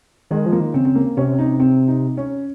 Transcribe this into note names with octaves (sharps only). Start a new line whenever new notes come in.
D#3 G#3
F3
A#3
D#3
C#3 C4
C4
A#3
C3 C#4
D#4
C4
D#4
C#4